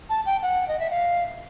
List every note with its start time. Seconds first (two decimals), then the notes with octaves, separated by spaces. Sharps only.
0.09 A5
0.26 G5
0.42 F#5
0.68 D#5
0.79 E5
0.91 F5